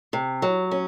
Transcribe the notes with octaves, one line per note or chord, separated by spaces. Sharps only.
C3
F#3
C#4